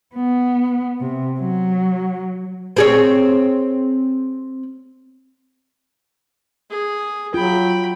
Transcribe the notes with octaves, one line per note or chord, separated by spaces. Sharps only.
B3
C3
F#3
C4 G#4 C#5
G#4
F#3 F4 G5 B5